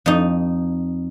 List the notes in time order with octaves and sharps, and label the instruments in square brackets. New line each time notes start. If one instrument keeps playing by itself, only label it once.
[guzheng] F2 D#4